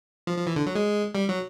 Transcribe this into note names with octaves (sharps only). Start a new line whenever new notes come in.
F3
F3
E3
D3
F#3
G#3
G3
F#3